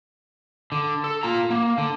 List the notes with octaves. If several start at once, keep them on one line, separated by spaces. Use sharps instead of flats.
D3
A4
F4 A#5
A#3
D3